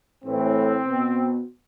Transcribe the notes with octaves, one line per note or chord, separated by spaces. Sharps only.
A2 E3 C4
B2